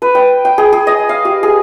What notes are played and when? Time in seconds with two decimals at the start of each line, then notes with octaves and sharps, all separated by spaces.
0.02 B4
0.15 G5
0.45 G5
0.58 G#4
0.73 G#4
0.87 D#5
1.09 F5
1.25 G4
1.43 G#4